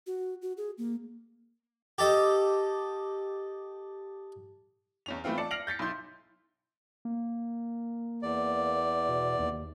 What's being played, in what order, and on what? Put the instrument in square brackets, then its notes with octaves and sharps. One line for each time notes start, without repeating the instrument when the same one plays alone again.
[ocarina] F#4
F#4
G#4
A#3
[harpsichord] G4 A4 D#5
[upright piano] E2 C#4 F7
E3 A3 B3 C4 F4
D5 A5 C#7
F6 A#6 C7 D7 F7 F#7
G6 A6 B6 C#7
B1 E4 C6 G6
[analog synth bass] A#3
[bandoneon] E2 D5
[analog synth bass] B2
D#2